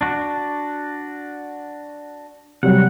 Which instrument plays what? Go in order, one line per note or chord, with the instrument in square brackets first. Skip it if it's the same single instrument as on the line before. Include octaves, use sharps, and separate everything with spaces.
[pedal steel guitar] D4 F#4
[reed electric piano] C3 F#3 G3 [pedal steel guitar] F#5